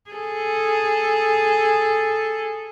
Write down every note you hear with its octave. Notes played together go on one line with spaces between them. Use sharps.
G#4 A4